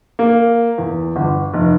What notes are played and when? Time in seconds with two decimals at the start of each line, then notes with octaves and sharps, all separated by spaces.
0.19 A#3
0.78 E2
1.16 G1
1.53 F1